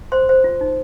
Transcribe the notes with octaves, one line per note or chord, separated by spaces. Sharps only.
C5 C6
C5
F4
D#4